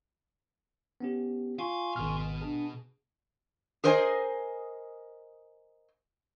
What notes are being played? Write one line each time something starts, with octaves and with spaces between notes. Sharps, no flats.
B3 C#4 G4
F4 F5 G#5 C6 C#6
G#1 B2 F6
D4 G#4
G#4 A#4 C5 D#5 F#5 G#5